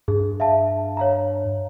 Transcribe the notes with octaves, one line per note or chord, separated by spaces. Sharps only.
G2 G#4
E5 F5 A5
C#5 F5 A#5